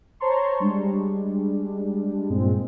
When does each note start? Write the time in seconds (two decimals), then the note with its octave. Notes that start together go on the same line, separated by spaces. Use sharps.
0.20 C5 C#5 A5 A#5 C6 C#6
0.60 G3 G#3 D4
2.30 G2 A#2 G#3 C4